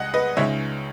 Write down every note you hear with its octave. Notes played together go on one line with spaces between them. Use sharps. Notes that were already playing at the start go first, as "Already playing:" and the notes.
Already playing: C#2 G#3 D#5 F#5
B4 D#5
C#2 C#3 G#3 D#4 C#5 E5